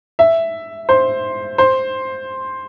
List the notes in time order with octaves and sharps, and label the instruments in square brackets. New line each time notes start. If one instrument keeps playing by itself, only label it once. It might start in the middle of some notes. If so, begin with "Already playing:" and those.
[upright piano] E5
C5
C5